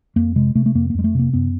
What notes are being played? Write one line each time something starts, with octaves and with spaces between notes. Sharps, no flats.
F2 A#3
C3 G#3
C3 A3
A3
F2 A#3
A#3
F2 G#3
A3
C3 A#3
F#2 B3